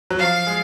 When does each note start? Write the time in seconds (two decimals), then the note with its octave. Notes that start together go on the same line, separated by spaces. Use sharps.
0.10 F#3
0.19 F3 F5
0.47 G#3